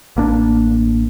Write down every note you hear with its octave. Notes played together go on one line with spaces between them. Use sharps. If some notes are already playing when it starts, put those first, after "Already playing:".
A1 A#3 D4